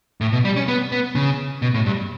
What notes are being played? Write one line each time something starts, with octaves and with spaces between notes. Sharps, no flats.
A2
B2
G3
C#4
B3
B3
C#3
B2
A2
G2